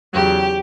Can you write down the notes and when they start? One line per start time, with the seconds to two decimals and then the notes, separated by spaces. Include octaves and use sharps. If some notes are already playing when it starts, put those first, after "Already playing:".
0.13 E2 C#3 F#3 G4